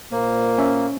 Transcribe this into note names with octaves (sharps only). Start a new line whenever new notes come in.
A#2 A#3 C5
C#4 E5